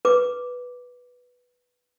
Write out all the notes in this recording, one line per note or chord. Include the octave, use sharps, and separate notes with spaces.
B4 D6